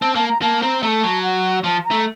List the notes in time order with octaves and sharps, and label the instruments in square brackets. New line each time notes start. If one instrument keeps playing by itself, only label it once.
[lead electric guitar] C4 [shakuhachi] A5
[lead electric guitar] A#3 [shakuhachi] A5
[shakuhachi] A#5
[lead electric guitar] A#3 [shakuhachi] A5
[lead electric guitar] C4 [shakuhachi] A#5
[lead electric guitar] A3 [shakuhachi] A5 A#5
[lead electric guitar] F#3
[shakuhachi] F#5
[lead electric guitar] F3 [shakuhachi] A5
[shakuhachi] A#5
[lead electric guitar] A3